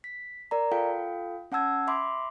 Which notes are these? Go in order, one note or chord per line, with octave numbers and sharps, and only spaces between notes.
B6
A#4 D5 A#5
F4 A4 F5 G5
C#4 F#5 A5 E6 G#6
E5 B5 C6 D6